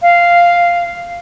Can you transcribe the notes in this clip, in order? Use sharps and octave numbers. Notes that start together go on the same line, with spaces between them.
F5